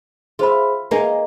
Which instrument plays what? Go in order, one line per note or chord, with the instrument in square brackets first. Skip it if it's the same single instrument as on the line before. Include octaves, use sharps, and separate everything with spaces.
[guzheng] F4 E5 [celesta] G#4 C5 B5
[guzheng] A#3 D#4 G#4 [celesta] B4 G#5